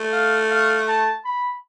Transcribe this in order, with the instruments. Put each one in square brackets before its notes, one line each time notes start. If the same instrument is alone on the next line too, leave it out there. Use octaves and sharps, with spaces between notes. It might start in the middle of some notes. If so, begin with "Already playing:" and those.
Already playing: [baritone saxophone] A3
[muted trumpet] F5
F5
A5
B5